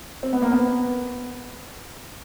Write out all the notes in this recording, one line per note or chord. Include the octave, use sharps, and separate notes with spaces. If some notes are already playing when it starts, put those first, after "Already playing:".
C4
B3
A#3
B3